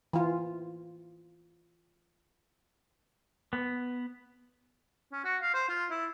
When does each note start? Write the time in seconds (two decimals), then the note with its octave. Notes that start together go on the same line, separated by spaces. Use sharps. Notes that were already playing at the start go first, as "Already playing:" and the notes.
0.13 E3 F4
3.53 B3
5.12 C#4
5.24 F#4
5.42 F5
5.54 C5
5.69 F4
5.90 E4